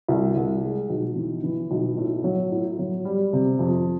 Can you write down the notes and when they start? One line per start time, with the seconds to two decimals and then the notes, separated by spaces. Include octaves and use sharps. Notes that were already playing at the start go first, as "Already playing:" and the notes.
0.08 C2
0.36 C2
0.63 G#3
0.90 B1
1.16 E3
1.43 E3
1.71 B1
1.97 A2
2.24 F#3
2.52 A2
2.79 F#3
3.05 G3
3.33 C3
3.59 F2